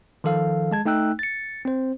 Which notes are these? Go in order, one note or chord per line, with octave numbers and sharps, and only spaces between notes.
D#3 F3 A4 F5
G#3 A5 G#6
A3 D#4 G5 E6 F#6
A6 C#7
C4 C5